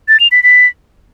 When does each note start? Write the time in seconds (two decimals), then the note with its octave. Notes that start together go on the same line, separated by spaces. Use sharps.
0.08 A6
0.20 F7
0.32 B6
0.43 B6